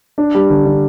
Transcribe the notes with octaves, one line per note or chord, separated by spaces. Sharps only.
D4
G3
D3
D3